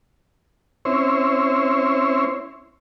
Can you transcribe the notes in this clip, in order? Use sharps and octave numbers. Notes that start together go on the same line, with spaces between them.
C4 C#4 E4 C5 C#5